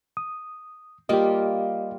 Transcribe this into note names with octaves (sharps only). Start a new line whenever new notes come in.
D#6
G3 A#3 F4 G4 D#5